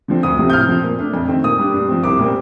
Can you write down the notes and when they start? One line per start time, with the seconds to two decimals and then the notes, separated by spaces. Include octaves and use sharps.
0.08 D3 F3 C4
0.23 D2 D#6
0.38 C3 F3 C4
0.50 G6
0.53 A2 F6
0.69 F3 C4
0.83 A#2
0.99 A3 D4
1.14 F2
1.28 D#3 A3 C4
1.44 A#2 D#6
1.59 G3 D4
1.74 G2
1.89 F3 C4
2.03 C2 D6
2.19 A#2 G3 C4